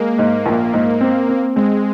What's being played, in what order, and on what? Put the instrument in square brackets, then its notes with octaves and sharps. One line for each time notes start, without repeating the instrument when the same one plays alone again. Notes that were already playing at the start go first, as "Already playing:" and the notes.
Already playing: [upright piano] G#3 [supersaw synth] A#3
[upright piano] G#2
A#1
G#2
C4
C4
[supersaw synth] G#3 [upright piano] C4